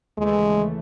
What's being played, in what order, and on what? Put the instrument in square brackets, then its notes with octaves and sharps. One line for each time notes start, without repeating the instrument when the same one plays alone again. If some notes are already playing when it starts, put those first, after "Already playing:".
[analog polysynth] D#2 C#3 E3 A3 [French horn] G#3